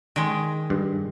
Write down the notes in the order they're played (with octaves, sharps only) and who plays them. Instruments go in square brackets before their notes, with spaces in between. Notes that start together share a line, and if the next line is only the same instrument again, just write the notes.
[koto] D#3 G#3
[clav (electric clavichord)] G2